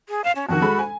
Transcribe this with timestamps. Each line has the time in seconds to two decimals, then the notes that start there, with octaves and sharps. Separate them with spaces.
0.09 G#4
0.24 F5 E7
0.36 C#4
0.49 F2 D#3 F#4
0.61 G#3 A4 B5
0.79 G#5